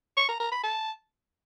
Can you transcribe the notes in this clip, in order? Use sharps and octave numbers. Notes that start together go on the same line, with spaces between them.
C#6
A#5
A#5
B5
A5